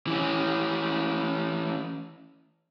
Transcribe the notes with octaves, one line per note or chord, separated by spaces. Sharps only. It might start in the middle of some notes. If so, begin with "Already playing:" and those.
E3 C#4